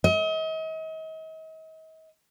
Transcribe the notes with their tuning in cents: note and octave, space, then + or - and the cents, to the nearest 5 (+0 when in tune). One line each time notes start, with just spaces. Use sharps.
D#5 +40